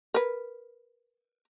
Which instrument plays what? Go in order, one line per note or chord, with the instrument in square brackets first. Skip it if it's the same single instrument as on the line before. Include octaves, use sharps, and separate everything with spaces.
[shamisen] A#4 B4